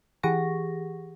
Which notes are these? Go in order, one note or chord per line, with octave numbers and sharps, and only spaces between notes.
E3 G4 G#4 F#5 C#6 A#6